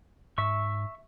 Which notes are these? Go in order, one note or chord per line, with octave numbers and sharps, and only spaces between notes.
G#2 E5 C#6